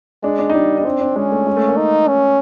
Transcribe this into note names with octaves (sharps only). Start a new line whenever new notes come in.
G#3 D4
D4
D#4
G3 D4
D#4
C4 D4
D4
G#3 C#4
A3
G#3
A3
A#3
D#4
C#4